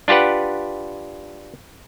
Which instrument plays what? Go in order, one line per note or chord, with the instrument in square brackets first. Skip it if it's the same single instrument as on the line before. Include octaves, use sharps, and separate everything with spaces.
[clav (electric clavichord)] D4 F4 G4 B4 F#5